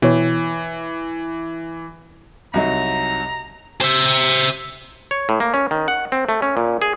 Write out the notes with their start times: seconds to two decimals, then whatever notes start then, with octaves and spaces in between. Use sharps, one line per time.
0.02 B2 E3 C#5 G5
2.54 C2 F#3 D#4 A#5
3.81 C5 E5
5.11 C#5
5.29 A2
5.40 A#3
5.54 C#4
5.71 D#3
5.88 F#5
6.12 C4
6.29 A3
6.42 C#4
6.57 A#2
6.82 G#4